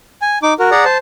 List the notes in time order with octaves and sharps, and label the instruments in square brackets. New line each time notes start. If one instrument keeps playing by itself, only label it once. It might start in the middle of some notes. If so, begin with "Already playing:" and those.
[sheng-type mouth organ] G#5
D#4 D6
F#4 A#4
G#4 D5 F#5 A#5
C5 A5